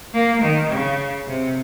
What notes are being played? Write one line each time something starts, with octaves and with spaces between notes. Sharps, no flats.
A#3
D#3
C#3
C3